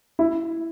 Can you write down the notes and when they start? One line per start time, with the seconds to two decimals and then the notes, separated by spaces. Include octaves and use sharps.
0.19 E4